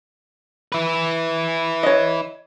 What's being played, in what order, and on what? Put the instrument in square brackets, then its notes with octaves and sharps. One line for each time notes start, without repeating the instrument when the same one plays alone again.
[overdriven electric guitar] E4 B4
[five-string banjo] C#5 D#5